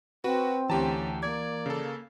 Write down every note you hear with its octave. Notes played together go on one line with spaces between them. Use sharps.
C4 F#4 B4
D2 E3 C#4 G4 A5 A#5
A#3 D5 G#6
C#3 A4